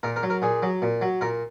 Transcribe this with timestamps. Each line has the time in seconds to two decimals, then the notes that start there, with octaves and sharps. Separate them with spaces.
0.03 A#2 A#4
0.16 A#4
0.23 F#3
0.30 A#4
0.42 A#2 G#4
0.63 F#3
0.82 A#2
1.02 F#3
1.21 A#2 A#4